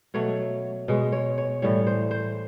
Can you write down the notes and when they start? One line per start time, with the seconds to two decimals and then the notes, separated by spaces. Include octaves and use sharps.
0.14 B2 F#3 A3 C#5
0.88 B2 G#3
1.12 C#5
1.38 C#5
1.62 A2 E3 G3 C#5
1.87 C5
2.11 C5